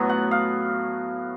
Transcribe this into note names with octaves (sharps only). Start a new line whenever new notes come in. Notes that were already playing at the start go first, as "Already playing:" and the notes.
Already playing: A2 F#3 B3
F#5
F5